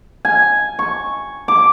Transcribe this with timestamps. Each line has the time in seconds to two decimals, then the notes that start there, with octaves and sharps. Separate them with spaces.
0.25 G#5
0.79 C#6
1.48 D6